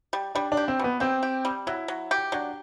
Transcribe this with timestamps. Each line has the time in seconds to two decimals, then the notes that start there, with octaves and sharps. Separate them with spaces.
0.13 G3
0.35 G3 D4
0.52 D4
0.57 G4
0.68 C4
0.79 B2 B3
1.00 C4 G4
1.23 G4
1.45 G3
1.67 F#3 E4
1.88 F#3
2.11 G4
2.32 F#3 D4